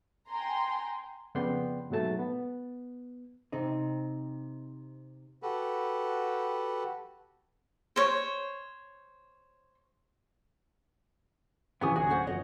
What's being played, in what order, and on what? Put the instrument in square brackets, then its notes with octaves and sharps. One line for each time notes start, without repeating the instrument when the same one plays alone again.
[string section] G5 G#5 A#5 C6
[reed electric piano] F2 C#3 B3 D5 G5 C6
G#2 B2 F#3 A3 A5 A6
B3
[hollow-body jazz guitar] C3 C4 D#4
[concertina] F#4 G4 A4 B4
[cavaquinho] C5 C#5
[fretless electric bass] C3 E3 F3 [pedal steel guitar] B3 D#6 [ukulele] C#4 G4 G#5
[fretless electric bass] D1 D2 [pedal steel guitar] F#4 G#4 [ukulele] G#5
[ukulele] C#4 C5 F#5
[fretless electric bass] F#1 F2 B2 [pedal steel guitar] C#5 [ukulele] D#5